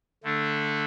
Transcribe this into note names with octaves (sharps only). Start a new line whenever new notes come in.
D3 A3 D4 A4